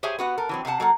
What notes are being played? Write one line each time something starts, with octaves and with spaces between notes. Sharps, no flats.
G4 G#4 C5 C#5 E5 G#5
B3 F#4 F#5
A4 A#4
E3 F#3 C4
C3 F5 F#5 A5
F#3 A#3 A4 F#5